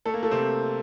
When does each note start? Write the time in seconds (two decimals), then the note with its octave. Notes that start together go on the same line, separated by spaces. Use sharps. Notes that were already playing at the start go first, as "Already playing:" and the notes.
0.05 A3 A4
0.14 A#3
0.23 A3 A4
0.31 C3 C4